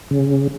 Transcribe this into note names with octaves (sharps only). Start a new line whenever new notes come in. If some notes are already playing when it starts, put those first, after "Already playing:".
C#3